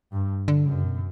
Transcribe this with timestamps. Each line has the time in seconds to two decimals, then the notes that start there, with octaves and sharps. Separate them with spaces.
0.13 G2
0.48 D3
0.66 F#2 C#3
0.84 B2